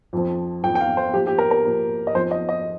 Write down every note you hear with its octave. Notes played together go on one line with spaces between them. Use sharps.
F2 F3
F2 F3 G5
G5
F5
C5
A#2 F3 G4
G4
A#4
A#4
A#2 F3
D#5
F2 F3 C5
D#5
D#5